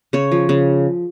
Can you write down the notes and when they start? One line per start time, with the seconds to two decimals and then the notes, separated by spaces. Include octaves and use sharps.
0.13 C#3 C#5
0.32 F3
0.49 C#3